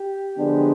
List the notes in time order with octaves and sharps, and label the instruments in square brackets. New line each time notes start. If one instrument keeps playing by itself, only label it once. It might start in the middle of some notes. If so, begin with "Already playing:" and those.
Already playing: [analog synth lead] G4
[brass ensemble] D3 F3 G#3 B3 D4